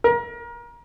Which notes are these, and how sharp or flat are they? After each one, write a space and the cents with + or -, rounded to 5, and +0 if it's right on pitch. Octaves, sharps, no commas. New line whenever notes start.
A#4 +30